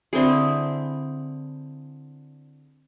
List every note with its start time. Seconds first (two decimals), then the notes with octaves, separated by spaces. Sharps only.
0.13 D3 C4 E4 G#4